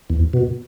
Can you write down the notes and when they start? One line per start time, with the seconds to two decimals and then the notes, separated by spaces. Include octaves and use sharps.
0.10 E2
0.33 B2